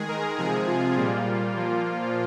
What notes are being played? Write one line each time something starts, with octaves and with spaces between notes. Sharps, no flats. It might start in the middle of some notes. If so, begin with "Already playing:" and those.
Already playing: D#3 G#3 G#4
A#4
C3 F3 G#3 G#4
F4
A#2 G3 A#3
A#2 F3 A#3